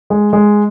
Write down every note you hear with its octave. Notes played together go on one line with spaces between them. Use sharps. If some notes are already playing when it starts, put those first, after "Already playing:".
G#3
G#3